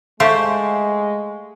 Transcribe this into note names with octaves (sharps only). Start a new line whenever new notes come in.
G#3 A3 G4 C5 F5 C#6